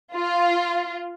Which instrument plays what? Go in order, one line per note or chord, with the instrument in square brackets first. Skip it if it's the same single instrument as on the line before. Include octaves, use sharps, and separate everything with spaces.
[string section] F4